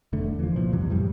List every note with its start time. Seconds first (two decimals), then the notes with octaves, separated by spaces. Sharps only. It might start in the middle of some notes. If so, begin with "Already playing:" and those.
0.13 E1 D3 A3
0.39 E3 F3
0.56 C2 A#2 F3
0.73 F2 C3 E3 G3
0.90 F#2 A2 G3